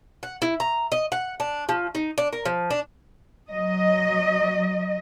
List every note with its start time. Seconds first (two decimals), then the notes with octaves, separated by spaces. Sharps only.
0.23 F#5
0.42 E4
0.60 A#5
0.92 D#5
1.12 F#5
1.40 D4
1.69 F3
1.95 D#4
2.18 D4
2.33 A#4
2.45 F3
2.71 D4
3.50 F#3 D#5